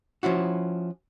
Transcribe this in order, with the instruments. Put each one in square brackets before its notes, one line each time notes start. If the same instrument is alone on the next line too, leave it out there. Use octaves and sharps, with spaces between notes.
[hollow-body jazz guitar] F3 C#4 E4 F#4